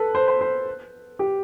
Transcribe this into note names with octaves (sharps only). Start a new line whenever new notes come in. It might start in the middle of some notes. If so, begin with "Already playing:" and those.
Already playing: A4 B4
C5
C5
C5
G4